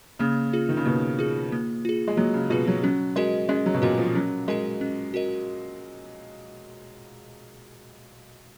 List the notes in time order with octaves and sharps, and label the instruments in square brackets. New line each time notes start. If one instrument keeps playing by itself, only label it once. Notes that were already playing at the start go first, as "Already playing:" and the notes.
[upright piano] C#3 [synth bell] A#3
[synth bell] F4 G#4
[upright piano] D#3
C#3
[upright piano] B2 [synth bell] A#3
[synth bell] F4 G#4
A#3
F4 G#4
[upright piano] G#3
[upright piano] F#3 [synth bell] A#3
[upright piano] C#3
[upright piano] B2 [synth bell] F4 G#4
[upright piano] F#3
[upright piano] F#3 [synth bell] C#4
[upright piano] G#3 [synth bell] F#4 A#4 D#5
[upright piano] G#3 [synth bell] C#4
[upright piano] F#3
B2
[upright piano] A#2 [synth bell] F#4 A#4 D#5
[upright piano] F3
[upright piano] F#3 [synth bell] C#4
[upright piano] G#3 [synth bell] F#4 A#4 D#5
[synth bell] C#4
F#4 A#4 D#5